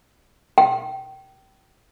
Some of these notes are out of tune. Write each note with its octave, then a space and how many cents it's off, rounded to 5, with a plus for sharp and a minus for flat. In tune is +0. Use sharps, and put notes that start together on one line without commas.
G5 -25